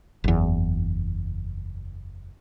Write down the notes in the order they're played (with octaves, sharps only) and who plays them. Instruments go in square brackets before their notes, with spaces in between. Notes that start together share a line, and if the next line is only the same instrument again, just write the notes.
[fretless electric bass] F#1 E2